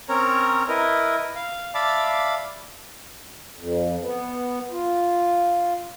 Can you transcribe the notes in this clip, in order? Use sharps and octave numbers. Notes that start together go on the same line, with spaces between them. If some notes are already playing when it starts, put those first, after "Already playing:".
C4 C#4 A#4 C#5 A#5
E4 A#4 B4 D#5
F5
D5 E5 F5 A5 B5 D6
F2
B3
F4